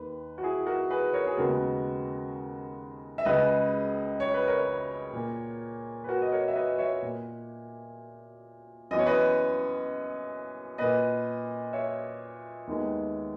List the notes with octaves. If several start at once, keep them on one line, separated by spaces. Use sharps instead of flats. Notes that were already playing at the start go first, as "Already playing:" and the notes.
Already playing: D#2 D#3 A#3 B4
F#4
E4 G#4
F#4 A#4
G#4 B4
A#4 C#5
G#4
D#2 C#3 G#3 B3 F#4 A#4
E5
C#2 C#3 G#3 B4 D#5
C#5
B4
A#4 C#5
A#2 A#3
B4
F#4 A#4
D#5
A#4 C#5
E5
B4 D#5
C#5 E5
A#2 A#3
F#2 E3 B3 D#5
C#5
B4 D#5
A#2 A#3 B4 D#5
C#5 E5
D#2 D#3 G#3 B3